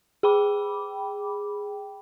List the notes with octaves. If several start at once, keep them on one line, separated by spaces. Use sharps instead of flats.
G#4 G5 B5 D6